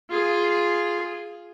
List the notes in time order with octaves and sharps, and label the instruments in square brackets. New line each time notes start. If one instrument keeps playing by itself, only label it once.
[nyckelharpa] F4 G#4